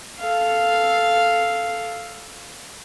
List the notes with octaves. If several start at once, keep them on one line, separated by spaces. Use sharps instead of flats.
A4 F5